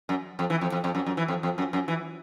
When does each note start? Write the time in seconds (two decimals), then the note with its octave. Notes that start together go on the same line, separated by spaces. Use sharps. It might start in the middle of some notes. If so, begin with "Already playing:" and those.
0.09 F#2
0.39 F2
0.50 E3
0.61 F2
0.72 F2
0.84 F2
0.95 F#2
1.06 F#2
1.17 E3
1.28 F2
1.43 F2
1.58 F#2
1.73 F#2
1.88 E3